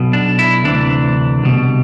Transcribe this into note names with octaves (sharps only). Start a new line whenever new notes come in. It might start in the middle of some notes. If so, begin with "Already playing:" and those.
Already playing: B1 B2
D4
E4
D2 C3 E3 D4
C2 B2